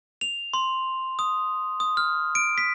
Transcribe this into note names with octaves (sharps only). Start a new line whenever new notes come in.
F7
C6
D#6
D#6
F6
D7
B6